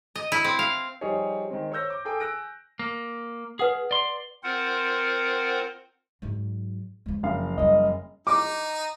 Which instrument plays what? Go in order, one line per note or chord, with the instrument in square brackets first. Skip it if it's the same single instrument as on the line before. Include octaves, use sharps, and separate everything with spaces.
[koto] D#5
E4
C4
F5
[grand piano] F3 G3 D#4 G#4 C#5
D#3 G#3 C4
C5 C#5 C#6 E6 G6 A#6
D6
G#4 A4 G5 D6
G#5 E6 F#6 A#6 D7
[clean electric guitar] A#3
[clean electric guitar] G#4 [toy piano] B4 F#5 D#6
[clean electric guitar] D5 C6
[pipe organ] C4 F4 A#4 C5 F#5
[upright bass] G#2 F#3
F3 G#3
[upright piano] F#1 F5
[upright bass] F3 G3 [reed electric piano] D#5
[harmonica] D#4 [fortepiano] D6